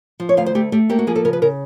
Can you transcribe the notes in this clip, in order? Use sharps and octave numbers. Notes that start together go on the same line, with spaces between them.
F3
C#5
D2 F5
C5
A3 G4
A3 G4
A#3 G4
F#4
F3 G#4
A4
C#3 A#4
B4
C#3 A#4